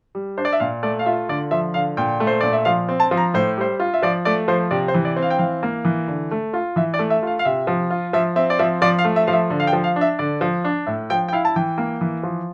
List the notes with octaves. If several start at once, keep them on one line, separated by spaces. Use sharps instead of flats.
G3
D4 C5
D5
E5
A#2 F5
A3 D5
F5
F4 E5
D3 D5
F3 E5
D3 F5
A#2 G5
A3
C5
A#2 D5
E5
F3 F5
C4
A5
F3
A#5
A2 C5
G3 C5
F4
E5
F3 D5
A3 D5
F3 C5
C3 D5
C5
E3
D5
C4
F5
G5
E3 F5
A#3
E3
D3
A3
F4
E3 E5
D5
A3
E5
F4 F5
F5
C3 E5
F3
F4
F3 E5
C4 E5
D5
F3 E5
F3 D5
F5
A3
E5
F3 F5
E5
D3
F5
G5
F3
F5
D4
E5
D3 D5
F3
D4
A2 E5
F3 G5
G5
E4 F5
A5
E3 G5
A#3
E3
F3